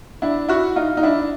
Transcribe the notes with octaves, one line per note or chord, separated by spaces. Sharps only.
D4 E4
E4 F#4
D#4 F4
D#4
D4 E4